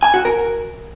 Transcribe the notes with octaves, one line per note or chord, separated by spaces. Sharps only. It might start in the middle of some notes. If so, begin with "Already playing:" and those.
G#5
F#4
A#4